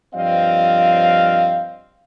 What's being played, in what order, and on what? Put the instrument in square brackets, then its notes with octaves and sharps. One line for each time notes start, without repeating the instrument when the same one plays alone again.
[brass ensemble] G2 F3 C4 D5 D#5 F5